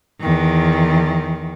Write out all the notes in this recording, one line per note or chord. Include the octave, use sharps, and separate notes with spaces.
E2 D#3